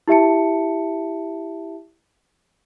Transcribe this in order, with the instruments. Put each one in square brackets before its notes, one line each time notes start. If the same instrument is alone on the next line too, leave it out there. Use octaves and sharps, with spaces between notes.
[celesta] E4 G4 E5 A5 C#7